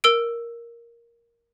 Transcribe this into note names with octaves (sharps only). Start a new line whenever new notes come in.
A#4 E6 D7